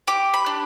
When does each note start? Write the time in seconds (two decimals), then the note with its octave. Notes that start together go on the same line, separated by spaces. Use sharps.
0.07 G4 D6
0.34 B5
0.46 D4